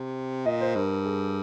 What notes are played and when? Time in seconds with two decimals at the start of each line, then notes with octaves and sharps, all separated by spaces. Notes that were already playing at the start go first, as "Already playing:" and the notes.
Already playing: C3
0.46 A#2 D#5
0.61 C5
0.75 G2 A#4
1.05 G#4